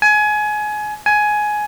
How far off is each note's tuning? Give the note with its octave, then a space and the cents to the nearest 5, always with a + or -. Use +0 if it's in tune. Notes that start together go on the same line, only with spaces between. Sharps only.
G#5 +25
G#5 +15